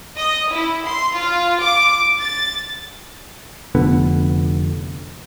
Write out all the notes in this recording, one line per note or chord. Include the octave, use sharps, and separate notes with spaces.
D#5
E4
C6
F4
D6
A6
F1 D3 B3